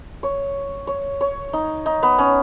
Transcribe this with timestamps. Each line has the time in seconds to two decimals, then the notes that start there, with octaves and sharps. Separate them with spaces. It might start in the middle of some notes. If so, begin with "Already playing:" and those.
0.23 C#5
0.87 C#5
1.21 C#5
1.53 D#4
1.86 D#4
2.03 B3
2.18 C#4